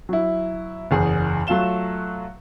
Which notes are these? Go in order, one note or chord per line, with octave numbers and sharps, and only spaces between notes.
F#3 E4
F#1 E2 G#4
F#3 A3 F4 F5 E7 G7